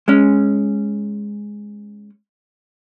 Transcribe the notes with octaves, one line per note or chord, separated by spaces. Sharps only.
G#3 C#4